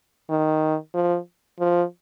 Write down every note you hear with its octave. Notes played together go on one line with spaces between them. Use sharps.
D#3
F3
F3